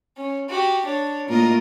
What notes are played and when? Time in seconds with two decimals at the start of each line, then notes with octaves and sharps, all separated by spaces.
0.17 C#4
0.49 F#4 G4
0.85 D4 C#5
1.28 A2 A#3 F4 A#4 D#5